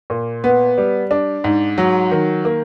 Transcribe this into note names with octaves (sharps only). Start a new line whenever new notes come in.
A#2
B3
G3
D4
G#2
F#3
D#3
A#3